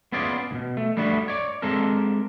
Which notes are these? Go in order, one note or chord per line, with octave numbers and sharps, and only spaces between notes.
B3 C#4 F4 G#4 D5
D2 B2
A3
G3 A3 B3 D4 F#4
C#5 D5
G#3 C4 D4 A4 A#4